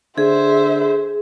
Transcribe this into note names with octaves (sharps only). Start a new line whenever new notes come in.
D3 G#4 C5 E5